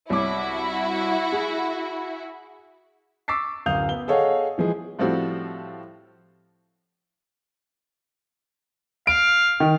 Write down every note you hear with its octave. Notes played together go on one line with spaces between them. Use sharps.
C2 E4 F#4 C#5 D6
G#4
C#6 D6 E6 A6 B6 C7
D1 F#2 F5 D#6 G6 F7
B3 G7
G#4 A4 C#5 D#5 F5 F#5
E3 F3 G#3 G#4
A2 F3 G3 C4 F#4 A4
F5 D7
D#3